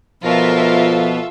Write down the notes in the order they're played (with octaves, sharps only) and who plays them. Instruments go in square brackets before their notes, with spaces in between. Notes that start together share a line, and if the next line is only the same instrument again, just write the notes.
[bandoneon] B2 [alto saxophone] F3 [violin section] F4 A4 E5 [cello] A#4